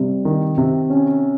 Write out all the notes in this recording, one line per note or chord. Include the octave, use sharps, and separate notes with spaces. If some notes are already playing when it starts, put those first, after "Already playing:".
Already playing: C3 G3
D#3
C3
C#4